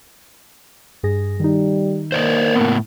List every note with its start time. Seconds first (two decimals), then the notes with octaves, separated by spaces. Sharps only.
1.03 G2 G#4 A#6
1.40 D#3 G3 D#4
2.12 A#3 C5 D5 D#5
2.55 A2 B3